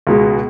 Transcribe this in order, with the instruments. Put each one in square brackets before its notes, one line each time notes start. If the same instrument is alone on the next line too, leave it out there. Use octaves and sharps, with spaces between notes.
[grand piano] C#2 B2 G#3